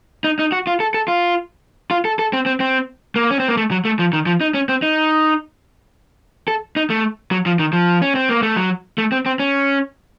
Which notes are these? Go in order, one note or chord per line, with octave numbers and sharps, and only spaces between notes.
D#4
D#4
F#4
F4
A4
A4
F4
F4
A4
A4
C4
C4
C4
A#3
C#4
C4
A#3
A3
F#3
A3
F3
D#3
F3
D#4
C#4
C4
D#4
A4
D#4
A3
F#3
F3
D#3
F3
C#4
C4
A#3
A3
F#3
A3
C4
C4
C#4